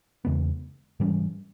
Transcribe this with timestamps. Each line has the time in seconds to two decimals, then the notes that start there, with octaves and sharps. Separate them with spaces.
0.25 E2 C#3 G#3 B3
1.00 G#2 E3 G3 C#4